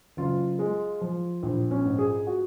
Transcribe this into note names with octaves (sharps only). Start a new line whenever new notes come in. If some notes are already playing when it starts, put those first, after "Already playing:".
F#1 F4
G#3
F3
A#1
C#4
G#2
G#4
F#4